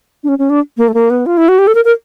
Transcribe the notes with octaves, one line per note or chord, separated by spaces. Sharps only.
D4
C#4
C#4
D4
A#3
A3
A#3
B3
F4
E4
F#4
G4
A4
A#4
A#4